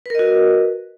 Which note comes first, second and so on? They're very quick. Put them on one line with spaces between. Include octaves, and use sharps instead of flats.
B4 A#4 D#5 F#4